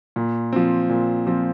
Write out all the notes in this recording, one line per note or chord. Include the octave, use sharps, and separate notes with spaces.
A#2
F3 C4
A#2
F3 C4